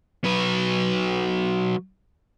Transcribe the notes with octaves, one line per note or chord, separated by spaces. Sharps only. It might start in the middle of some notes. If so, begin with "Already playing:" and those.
F#3 B4